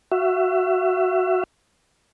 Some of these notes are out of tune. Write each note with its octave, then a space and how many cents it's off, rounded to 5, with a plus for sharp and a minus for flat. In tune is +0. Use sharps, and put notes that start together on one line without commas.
F#4 +0 E5 +30